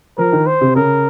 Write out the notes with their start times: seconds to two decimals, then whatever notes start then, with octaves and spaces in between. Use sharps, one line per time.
0.18 F3 A#4
0.32 D#3
0.46 C5
0.61 C3
0.76 C#3 A#4